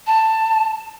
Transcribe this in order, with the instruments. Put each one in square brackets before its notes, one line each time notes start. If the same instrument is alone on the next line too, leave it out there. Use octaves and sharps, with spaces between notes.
[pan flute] A5